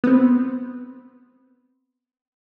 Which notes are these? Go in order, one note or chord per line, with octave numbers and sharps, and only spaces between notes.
B3 C4